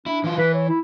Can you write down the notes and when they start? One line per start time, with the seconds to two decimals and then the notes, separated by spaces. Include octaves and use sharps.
0.06 D4 E4
0.24 E3 F4
0.38 E3 B4
0.54 C#5
0.69 E4